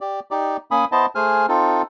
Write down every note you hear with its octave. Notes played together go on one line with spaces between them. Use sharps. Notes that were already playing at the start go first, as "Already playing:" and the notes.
G4 D5
D#4 G4 D5
A#3 C#4 G#5 B5 D#6
B3 E4 C5 D#5 A5
A3 G#4 C5 G#5 F6
C4 D#4 F4 A4